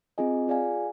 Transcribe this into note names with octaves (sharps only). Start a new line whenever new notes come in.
C4 F4 G#4 D#5 G#5
F4 G#4 D5 F5 G#5